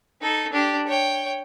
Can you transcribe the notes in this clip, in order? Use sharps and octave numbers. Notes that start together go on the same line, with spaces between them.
D#4 A4
D4 G4
C#5 G5